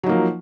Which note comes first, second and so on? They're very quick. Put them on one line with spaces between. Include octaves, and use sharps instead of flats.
F#3 D#4 A#3 F3